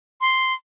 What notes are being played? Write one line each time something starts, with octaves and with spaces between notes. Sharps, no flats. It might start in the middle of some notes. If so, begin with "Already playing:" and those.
C6